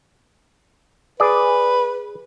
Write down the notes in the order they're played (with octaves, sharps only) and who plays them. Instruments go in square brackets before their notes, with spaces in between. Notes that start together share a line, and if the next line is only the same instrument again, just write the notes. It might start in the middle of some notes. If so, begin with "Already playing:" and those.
[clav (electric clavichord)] G#4 D5 [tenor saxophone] B4